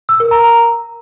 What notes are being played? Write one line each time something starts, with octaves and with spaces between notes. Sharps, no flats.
E6
A#4
A#5